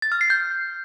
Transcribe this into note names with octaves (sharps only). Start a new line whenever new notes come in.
A6
F6
C7
G6